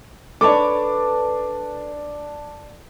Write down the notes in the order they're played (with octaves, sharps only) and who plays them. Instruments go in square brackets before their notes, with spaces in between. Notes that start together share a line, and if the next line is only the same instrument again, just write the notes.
[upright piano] D4 A5 D6 [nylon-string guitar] A4 B4 C#5